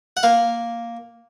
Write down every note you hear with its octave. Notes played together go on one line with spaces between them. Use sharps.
F#5
A#3 F5